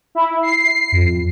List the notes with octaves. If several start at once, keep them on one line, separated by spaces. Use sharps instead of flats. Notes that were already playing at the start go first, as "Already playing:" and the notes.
E4
C7
F2